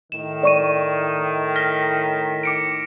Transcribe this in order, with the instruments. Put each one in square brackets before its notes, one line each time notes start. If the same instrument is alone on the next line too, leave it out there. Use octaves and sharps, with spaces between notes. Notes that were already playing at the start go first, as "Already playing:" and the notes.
[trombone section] A2 D#3 [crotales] E7
[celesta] D5 C#6 D#7
[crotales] F6 A#6 B6
D6 C#7 D7